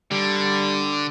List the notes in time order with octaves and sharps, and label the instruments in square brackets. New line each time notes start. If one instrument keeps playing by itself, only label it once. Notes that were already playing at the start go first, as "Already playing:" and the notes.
[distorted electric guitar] D3 [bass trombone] G3